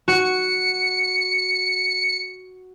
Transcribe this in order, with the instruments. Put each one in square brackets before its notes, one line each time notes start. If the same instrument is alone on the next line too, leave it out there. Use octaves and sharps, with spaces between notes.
[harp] F#4 [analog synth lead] C#7